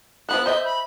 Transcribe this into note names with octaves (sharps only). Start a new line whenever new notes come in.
F3 B3 A4 F#6
C5 D#5 E5 G6
B5